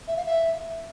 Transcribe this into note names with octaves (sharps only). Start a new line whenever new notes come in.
E5
F5
E5